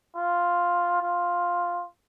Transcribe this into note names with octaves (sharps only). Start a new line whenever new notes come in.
F4
F4